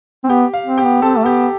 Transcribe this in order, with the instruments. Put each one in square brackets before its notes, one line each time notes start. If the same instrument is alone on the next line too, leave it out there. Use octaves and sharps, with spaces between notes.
[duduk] C4
[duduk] B3 [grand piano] G4 G5
[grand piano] F5
[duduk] C4
[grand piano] G4 G5
[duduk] B3
[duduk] C4 [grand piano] A4 A5
[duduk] A3
[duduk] B3 [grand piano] G4 G5